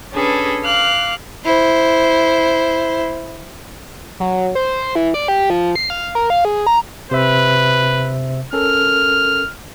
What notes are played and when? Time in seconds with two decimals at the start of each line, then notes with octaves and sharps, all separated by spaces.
0.12 C#4 D4 G#4 A4 B4
0.64 F5 D6 F6 F#6
1.45 E4 C5
4.20 F#3
4.55 C5
4.95 E3
5.14 D5
5.28 G4
5.50 F3
5.75 C7
5.90 F5
6.15 A#4
6.30 F5
6.45 G#4
6.67 A#5
7.11 C3 B4 C5 E5
8.53 C#4 A4 A#4 F6